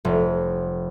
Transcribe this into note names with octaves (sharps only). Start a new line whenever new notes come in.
F1